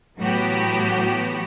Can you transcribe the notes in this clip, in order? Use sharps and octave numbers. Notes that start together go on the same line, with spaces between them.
A2 E3 F#3 B3 F#4 G4